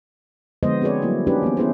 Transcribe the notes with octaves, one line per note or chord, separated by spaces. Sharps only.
D3 F3 G#3 B3 C5 D#5
C4 F#4 G#4 B4 C#5 D5
F#3 G3 A#3 E4
C#4 D4 E4 F4 G4 B4
E3 A#3 B3
B3 C#4 E4 G#4 B4 C5